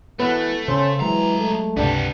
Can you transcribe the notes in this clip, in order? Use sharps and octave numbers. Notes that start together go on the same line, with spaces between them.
E3 A3 B3 B4
C#3 C#4 C5
C#2 E3 F#3 G#3 A#5
A3
C#2 G2 C3 G3 B3 D4